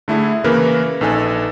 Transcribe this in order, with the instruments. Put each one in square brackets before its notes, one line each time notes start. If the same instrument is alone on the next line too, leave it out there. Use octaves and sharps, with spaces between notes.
[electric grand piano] D3 A3 E4 G#4
C#3 E3 A#3 C#4 A#4 B4
A#1 D#4 A4 B4 G#5